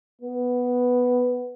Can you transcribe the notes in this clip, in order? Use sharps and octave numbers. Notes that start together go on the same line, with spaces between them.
B3